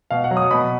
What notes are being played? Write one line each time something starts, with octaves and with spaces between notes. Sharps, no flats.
B2 F5
F#5
F#3
D#6
B2 B5